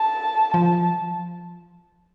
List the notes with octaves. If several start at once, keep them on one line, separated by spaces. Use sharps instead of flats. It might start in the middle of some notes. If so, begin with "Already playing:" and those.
Already playing: A5
F3 A5